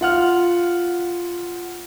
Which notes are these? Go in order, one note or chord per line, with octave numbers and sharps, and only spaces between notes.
F4 F#5 F6